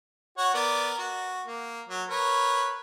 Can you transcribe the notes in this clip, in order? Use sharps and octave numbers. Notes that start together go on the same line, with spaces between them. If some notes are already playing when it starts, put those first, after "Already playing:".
F#4 C#5 F#5
B3 A#4 D5
F#4
A#3
F#3
A#4 B4 C#5